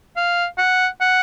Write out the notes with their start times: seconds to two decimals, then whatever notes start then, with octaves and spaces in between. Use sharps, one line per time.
0.16 F5
0.58 F#5
1.01 F#5